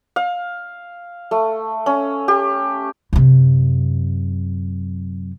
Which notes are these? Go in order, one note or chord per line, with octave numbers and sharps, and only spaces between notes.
F5
A3
C#4
G4
F#2 C3